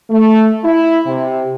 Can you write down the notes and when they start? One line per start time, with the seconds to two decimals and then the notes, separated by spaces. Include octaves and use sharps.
0.10 A3
0.64 E4
1.06 C3